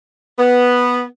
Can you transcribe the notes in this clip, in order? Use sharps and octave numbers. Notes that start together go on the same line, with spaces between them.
B3